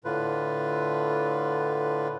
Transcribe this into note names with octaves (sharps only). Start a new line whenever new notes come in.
A2 D3 F4 B4